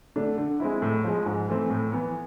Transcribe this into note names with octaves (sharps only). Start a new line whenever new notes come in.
D3 A3 D4
D3
G#3 C4 E4
A2
F3 G#3
G#2
E3 A3 C4
A2
E3 B3